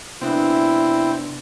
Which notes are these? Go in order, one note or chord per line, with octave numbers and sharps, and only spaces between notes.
C3 B3 C4 D4 E4